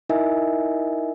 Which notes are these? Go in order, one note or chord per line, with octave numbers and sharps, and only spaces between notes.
D#4 E4 A#4 D#5 E5 G#5